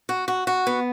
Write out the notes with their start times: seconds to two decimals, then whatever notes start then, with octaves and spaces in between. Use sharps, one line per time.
0.09 F#4
0.28 F#4
0.47 F#4
0.67 B3